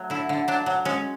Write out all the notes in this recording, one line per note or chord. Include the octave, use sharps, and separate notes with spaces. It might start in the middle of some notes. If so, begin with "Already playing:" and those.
Already playing: F#3 A3
D3 E4
D3
F#3 D4
F#3
G#3 C#4